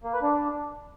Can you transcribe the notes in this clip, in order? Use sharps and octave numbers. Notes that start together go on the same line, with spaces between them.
A#3
B4
D4